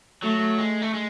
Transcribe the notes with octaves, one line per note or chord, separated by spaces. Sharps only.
F#3 A3
G#3
A3
G#3